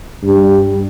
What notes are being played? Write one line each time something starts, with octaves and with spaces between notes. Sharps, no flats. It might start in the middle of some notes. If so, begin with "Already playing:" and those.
G2